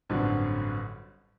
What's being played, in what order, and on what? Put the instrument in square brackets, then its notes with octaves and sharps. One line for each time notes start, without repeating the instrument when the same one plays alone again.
[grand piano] A1 G2 D3 F#3 C4